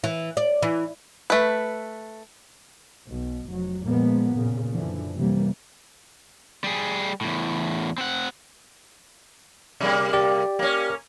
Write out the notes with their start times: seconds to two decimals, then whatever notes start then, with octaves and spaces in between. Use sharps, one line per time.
0.04 E3
0.37 D5
0.62 E3
1.30 A3 B4
3.08 B1 B2
3.48 F1 F#3
3.85 A#2 F3 G#3 A#3 B3
4.35 F2 A#2 C#3
4.73 F#2 D3 E3 F3
5.16 C3 E3 G3 A#3
6.64 G3 G#4
7.21 E2 A2
7.98 C4 F#5
9.80 C3 G3 A#3
10.13 G4 D5
10.59 A#3 C#4